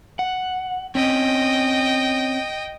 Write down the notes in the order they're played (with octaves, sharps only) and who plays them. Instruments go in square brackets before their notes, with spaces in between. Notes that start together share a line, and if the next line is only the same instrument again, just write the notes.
[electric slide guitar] F#5
[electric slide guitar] C4 C#4 [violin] D#5 G5